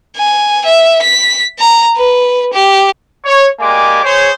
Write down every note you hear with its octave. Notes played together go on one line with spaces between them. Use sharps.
G#5
E5
B6
A#5
B4
G4
C#5
G#3 A#3 G4 D5 G#5 D6
G#4 C5 C#5